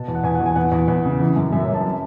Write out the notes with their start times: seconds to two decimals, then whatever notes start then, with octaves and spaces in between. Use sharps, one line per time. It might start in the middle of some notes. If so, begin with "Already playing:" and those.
Already playing: B2 A5
0.08 E2
0.15 F#5
0.24 E2 G#5
0.35 F#5
0.40 E2
0.46 G#5
0.56 E2 F#5
0.72 E2
0.88 E2
1.05 C#3
1.20 E3
1.36 F#2
1.52 F#2 E5
1.63 C#5
1.68 F#2
1.74 A5